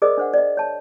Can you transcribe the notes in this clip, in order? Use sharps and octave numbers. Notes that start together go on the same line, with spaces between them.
G#4 A#4 C5 D5 D#5 D#6
D4 C5 F#5
D5 D#5
C#5 A5